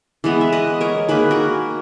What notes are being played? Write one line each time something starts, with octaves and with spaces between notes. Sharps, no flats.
E3 G#3 B3
E5
B4 D#5
A#4 C#5
D#3 A#3 G#4 B4
F#4 A#4